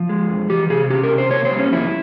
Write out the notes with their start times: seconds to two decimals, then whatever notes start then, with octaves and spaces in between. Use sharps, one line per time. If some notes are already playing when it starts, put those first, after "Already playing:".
Already playing: F3
0.09 G#3
0.29 F2
0.49 E3 G4
0.70 C3 G#4
0.90 C#4 G4
1.03 A#4
1.11 C3
1.18 C5
1.31 A#3 C#5
1.45 C5
1.51 G3
1.58 C#4
1.72 F2 E4